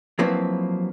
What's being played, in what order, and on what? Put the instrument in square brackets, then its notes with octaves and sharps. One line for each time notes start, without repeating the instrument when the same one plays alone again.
[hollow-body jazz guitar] F3 F#3 A#3 C4 E4 B4